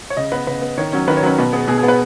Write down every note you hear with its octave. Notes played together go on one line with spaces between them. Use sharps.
C#5
C#3 D#5
B3 B4
C#3 B4
B3
D#3 C#5
F#3 C#4
D#3 B4
C#5
F#3 C#4 B4
B2 B4
B3 G#4
B2 G#4
G#4
B3
B4